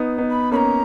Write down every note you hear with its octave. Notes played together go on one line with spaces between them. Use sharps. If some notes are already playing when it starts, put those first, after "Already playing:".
Already playing: B3 D#4
B3 D#4
B5
A#3 C#4 A#5 B5